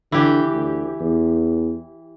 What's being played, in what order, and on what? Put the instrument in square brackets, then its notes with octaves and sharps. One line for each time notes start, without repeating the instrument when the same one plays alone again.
[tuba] D3 [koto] E3 G4
[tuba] D2
E2